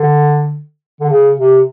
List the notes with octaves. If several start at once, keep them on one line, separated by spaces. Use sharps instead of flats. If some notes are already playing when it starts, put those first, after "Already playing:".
Already playing: D3
D3
C#3
C3